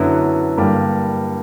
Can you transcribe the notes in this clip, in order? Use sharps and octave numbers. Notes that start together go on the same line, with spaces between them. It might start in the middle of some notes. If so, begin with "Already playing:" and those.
Already playing: F#2 D3 F#3 B3 E4
G2 D3 G3 A#3